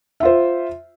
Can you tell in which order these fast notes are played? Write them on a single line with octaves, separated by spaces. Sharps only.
E5 F4 C5